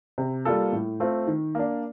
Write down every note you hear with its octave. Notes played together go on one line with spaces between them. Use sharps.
C3
G3 A#3 F4 A4
A2
A3 C4 F4
D#3
A#3 D4